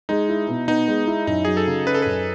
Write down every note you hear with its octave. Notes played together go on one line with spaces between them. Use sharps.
G#3 D#4
E4
B2
B3 D#4
G#3
E4
F#2 D#4
F#3 G#4
A4
C#3
C#4 B4
A4
F#2 B4